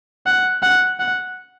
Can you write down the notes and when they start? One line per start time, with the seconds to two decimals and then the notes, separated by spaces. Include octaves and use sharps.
0.26 F#5
0.62 F#5
1.00 F#5